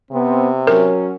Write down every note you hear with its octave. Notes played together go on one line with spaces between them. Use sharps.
C3 B3 C4
F#3 C#4 A#4